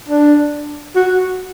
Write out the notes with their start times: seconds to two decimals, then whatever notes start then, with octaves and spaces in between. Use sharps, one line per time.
0.08 D4
0.95 F#4